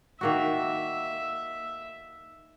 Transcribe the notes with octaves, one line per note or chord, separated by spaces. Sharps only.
D#3 A#3 F#4 E5